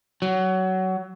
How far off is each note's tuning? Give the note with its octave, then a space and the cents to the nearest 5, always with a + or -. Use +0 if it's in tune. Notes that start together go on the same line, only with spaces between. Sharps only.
F#3 +20